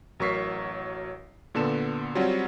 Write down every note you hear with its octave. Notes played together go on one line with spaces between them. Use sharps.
A1 F#3 A#4 C#6 B6 C7
A#2 D3 B3 A4 E7
F#3 G3 C4 C#4 F4 F#4